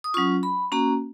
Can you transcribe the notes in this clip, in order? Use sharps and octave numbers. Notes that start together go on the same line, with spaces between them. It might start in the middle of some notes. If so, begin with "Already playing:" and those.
D#6
F#3 C#4 F4 C#6
B5
A#3 C#4 F#4 A#5